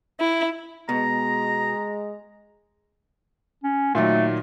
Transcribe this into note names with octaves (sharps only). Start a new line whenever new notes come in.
E4
B2 G#3 A#5
C#4
A#2 D#3 F#3 A3